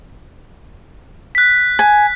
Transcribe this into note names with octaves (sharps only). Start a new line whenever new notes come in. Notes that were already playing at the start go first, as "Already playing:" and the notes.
F#6 B6
G#5